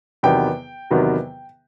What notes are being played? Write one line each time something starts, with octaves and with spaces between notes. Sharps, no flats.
E2 C3 D#3 F#3 B3 G5
E2 C3 D#3 F#3 B3